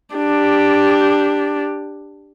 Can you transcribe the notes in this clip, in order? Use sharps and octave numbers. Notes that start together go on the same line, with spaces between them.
D4 G4